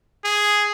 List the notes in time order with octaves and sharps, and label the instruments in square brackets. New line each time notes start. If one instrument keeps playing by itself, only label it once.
[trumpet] G#4